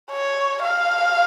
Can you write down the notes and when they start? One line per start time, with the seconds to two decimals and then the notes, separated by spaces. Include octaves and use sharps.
0.11 C#5
0.62 F5